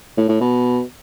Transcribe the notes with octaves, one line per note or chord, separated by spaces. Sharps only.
A2
A2
B2